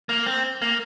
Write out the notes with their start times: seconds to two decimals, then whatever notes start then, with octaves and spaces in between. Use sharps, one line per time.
0.09 A#3
0.26 C4
0.62 A#3